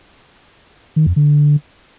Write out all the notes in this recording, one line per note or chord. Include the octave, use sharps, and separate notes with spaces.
D#3
F2
D3